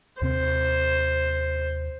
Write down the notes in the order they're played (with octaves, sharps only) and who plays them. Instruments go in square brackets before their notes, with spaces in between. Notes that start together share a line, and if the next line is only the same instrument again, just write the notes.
[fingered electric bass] D#2 C3 C4 [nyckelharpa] C5